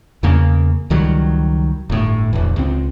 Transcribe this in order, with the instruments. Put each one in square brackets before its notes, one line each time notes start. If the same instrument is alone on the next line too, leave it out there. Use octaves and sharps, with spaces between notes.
[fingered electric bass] E2 C#3 A#3
C#2 D#3 F#3 G3
G1 A2
D1 E2
C#2 C4